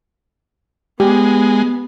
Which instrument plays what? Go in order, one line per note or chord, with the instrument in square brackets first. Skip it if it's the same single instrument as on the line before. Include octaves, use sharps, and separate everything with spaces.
[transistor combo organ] G#3 [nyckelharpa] B3 [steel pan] G4